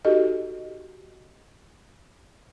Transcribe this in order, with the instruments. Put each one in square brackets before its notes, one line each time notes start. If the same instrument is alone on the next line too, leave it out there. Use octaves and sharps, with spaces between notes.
[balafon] D#4 F#4 G4 A4 D#5